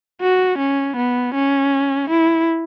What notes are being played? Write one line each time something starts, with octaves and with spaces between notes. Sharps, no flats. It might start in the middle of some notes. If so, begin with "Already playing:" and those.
F#4
C#4
B3
C#4
E4